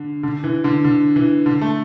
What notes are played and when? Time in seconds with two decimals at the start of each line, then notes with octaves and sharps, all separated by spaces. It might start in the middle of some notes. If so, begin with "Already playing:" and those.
Already playing: D3
0.23 D3
0.44 E3
0.64 D3
0.84 D3
1.16 E3
1.46 D3
1.61 A3